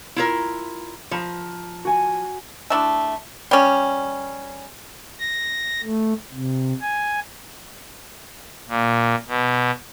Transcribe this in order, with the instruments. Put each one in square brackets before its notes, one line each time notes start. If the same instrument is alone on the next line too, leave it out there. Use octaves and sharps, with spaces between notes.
[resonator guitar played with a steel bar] E4 F4 A#4
[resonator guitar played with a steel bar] F3 [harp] A#5 B5
[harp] F#4 G#5
[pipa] A3 D4 E4
G3 C#4
[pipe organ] A#6
A3
C3
G#5
A#2
B2